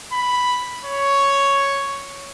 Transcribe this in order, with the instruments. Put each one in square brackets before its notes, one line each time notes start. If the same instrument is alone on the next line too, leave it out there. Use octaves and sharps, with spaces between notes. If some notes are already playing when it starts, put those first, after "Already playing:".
[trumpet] B5
C#5